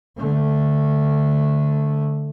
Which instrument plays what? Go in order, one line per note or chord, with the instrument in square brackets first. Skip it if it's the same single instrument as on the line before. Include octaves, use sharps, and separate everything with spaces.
[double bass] D3 A3